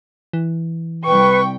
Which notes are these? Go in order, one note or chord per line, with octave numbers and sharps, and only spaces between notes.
E3
C2 B4 G5 C#6